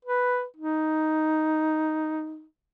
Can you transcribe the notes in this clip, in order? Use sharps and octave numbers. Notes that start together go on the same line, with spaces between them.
B4
D#4